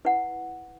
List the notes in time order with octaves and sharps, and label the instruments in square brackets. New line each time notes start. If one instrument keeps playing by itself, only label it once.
[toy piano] E4 B4 F#5